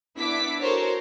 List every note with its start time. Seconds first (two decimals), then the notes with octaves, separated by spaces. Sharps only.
0.17 B3 D4 E4 D6 B6
0.61 F#4 A4 A#4 C5 C#5